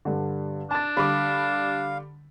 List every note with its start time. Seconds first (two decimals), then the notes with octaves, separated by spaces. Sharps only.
0.05 G2 D3
0.71 D4 A5 A6
0.97 D3 G3 F5 B5 D6